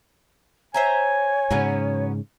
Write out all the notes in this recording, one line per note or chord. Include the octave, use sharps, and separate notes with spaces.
C5 C#5 E5 G#5 A#5
G#2 C#3 F#3 B3 C#4